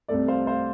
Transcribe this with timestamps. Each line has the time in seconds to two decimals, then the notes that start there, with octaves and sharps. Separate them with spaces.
0.08 C2 C3 A3 C4 A4 D5
0.28 C5 F5
0.47 C5 F5